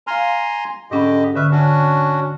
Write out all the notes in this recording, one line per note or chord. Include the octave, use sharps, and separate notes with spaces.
F5 G#5 A#5 C6 F6
G#2 D3 C#4 G4 D#5 B5
D3 B4 E5 C#6 F6
C#4 D4 F#4